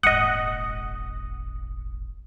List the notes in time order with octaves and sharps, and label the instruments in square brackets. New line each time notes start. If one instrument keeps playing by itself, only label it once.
[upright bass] D#1 G#1 [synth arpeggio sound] D#5 F#5 [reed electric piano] D#6